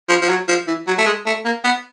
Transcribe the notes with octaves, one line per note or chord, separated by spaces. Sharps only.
F3
F3
F#3
F3
E3
F#3
A3
G#3
A3
A#3
B3